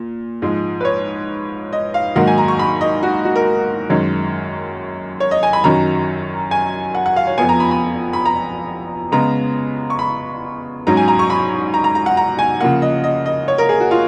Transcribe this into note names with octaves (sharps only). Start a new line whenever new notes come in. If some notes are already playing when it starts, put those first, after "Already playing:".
Already playing: A#2
G#2 F3 G#3
B4
C#5
D#5
F5
G#2 D#3 F#3 A#3 F#5
G#5
A#5
C#6
B5
D#5
F#4
F#4
A#4
F#2 D#3 G#3 C#4
C#5
D#5
G#5
B5
F#2 D#3 F#3 C#4 A#5
G#5
F#5
F#5
F5
C#5
F2 F3 B3 G#5
A#5
B5
B5
B5
A#5
C#3 G#3 B3 A#5
C#6
B5
G#2 F#3 C#4 A#5
G#5
A#5
C#6
B5
A#5
A#5
A#5
F#5
A#5
G#5
C#3 F3 A#3 F#5
D#5
D#5
D#5
C#5
A#4
G#4
F#4
F4